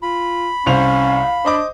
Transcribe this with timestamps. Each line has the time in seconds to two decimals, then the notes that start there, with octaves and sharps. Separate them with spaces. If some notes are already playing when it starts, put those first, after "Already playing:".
0.02 F4 B5
0.66 C2 C#4 C5 F5 F7
1.45 D4 C5 D#5 D6